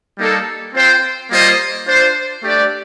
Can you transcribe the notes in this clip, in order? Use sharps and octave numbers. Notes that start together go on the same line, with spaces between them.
G3 A#3 D#4 A4
C4 F4 C5 G5
G3 A#3 F4 C5 D#5
D4 F4 C5
A3 D4 G4 D5